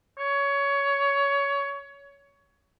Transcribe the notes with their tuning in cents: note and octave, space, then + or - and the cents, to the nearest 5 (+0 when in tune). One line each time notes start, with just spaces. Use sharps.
C#5 +20